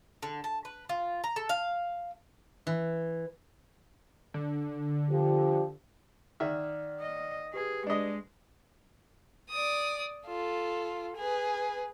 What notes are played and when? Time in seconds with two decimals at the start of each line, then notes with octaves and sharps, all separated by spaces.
0.23 D3
0.44 A5
0.65 B4
0.89 F4
1.24 A#5
1.36 A4
1.49 F5
2.67 E3
4.34 D3
5.10 F3 G4
6.40 D#3 D5 E5 F#5 F6
7.01 D#5
7.54 G4 G#4 B4
7.87 G#3 D4 D#5
9.50 D5 D#6
10.27 F4 A4
11.17 G#4 B4